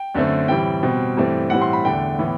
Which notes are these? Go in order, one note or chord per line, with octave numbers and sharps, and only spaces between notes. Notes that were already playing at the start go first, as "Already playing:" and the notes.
Already playing: G5
F#2 D3 A3 C4
A2 E3 G3 C4 G5
B2 G3 C4
G2 E3 A3 C4
A2 E3 G3 C4 F#5
C6
B5
E2 D3 A3 G5
A2 E3 B3